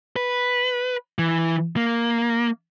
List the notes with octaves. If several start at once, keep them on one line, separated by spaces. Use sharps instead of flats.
B4
E3
A#3